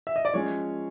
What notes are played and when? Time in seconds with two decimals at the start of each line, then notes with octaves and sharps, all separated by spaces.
0.07 E5
0.16 D#5
0.25 D5
0.34 F3 G#3 C#4 C#5